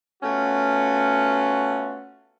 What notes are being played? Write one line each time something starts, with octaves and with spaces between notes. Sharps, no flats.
A3 B3 C#4 F4 F#4